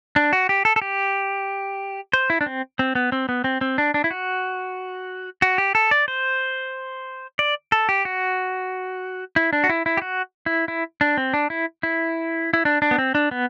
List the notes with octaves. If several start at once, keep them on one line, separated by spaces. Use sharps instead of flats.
D4
F#4
G4
A4
A4
G4
C5
E4
D4
C4
C4
B3
C4
B3
C4
C4
D4
D4
E4
F#4
F#4
G4
A4
D5
C5
D5
A4
G4
F#4
E4
D4
F#4
E4
E4
G4
F#4
E4
E4
D4
C4
D4
E4
E4
E4
D4
D4
B3
C4
D4
B3